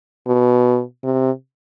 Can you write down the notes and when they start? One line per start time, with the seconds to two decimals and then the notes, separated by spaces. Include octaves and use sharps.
0.27 B2
1.04 C3